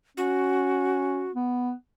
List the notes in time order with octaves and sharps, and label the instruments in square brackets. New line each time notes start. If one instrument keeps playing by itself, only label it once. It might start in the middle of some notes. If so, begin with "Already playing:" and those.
[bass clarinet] C#4 [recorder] F#4
[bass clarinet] B3